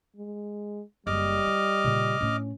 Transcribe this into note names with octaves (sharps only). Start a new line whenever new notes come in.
G#3
F#1 G3 G#3 D#5 D6 F6
E4
A#2 C#3
A2 C#4 D4